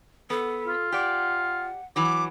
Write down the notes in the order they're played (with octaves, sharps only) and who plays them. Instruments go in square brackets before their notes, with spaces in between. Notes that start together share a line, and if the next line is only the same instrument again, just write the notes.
[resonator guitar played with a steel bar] B3 [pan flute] A4
[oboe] F4
[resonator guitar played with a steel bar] G4 D5 [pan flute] F#5
[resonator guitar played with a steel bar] E3 F#3 [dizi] D6